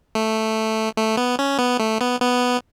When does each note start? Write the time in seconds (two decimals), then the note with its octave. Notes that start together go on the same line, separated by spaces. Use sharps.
0.15 A3
0.97 A3
1.17 B3
1.39 C#4
1.59 B3
1.79 A3
2.01 B3
2.21 B3